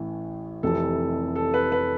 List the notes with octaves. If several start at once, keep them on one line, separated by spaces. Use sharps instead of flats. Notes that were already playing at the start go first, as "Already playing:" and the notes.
Already playing: A1 A2 E3
F1 F2 C3 E3 A4
A4
B4
B4